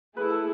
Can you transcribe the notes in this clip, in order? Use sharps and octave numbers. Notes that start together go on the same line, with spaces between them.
A3 E4 G#4 B4
A4